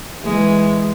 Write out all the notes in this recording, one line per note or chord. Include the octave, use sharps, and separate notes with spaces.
E3 G#3